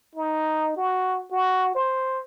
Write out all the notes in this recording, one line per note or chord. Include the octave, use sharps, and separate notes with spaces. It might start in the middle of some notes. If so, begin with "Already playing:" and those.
D#4
F#4
F#4
C5